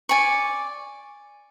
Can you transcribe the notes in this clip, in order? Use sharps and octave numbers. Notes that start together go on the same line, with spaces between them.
D5 G#5 C#6